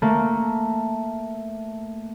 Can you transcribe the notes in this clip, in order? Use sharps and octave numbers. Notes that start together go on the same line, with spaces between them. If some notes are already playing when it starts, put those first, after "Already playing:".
A3 A#3